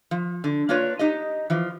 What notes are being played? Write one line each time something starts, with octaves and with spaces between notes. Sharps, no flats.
F3
D3
A#3 D4 F4 B4 C#5
D#4 G4 D#5
E3 F3